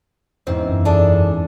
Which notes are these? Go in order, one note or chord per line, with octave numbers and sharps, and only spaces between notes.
E2 G#2 C4 C#4
F#2
D4 G#4 A4